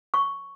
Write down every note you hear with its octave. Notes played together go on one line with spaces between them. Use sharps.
C#6